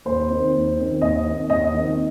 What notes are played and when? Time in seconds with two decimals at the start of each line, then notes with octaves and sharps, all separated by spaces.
0.05 D#2 C5
0.29 D#3 C4
0.53 D#2
0.77 D#3 C4
1.01 D#2 D#5
1.26 D#3 C4
1.49 D#2 D#5
1.74 D#3 C4